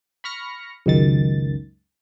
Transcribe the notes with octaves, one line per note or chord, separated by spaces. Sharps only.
B5 C#6 F6 A#6 C#7
C#2 F#2 D#3 A6